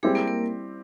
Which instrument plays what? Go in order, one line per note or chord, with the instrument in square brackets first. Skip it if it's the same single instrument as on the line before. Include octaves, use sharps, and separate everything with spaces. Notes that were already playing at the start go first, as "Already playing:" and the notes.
[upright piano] G3 C4 E4 G4 [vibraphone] G#3 G#4
[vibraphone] A#3 A#4
A#3 A#4